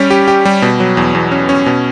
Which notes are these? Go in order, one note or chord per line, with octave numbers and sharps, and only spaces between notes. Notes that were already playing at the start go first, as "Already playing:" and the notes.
Already playing: G3 C#4 G4
G4
G4
G3
B2
F#3
E2
E2
C#4
C#4
B2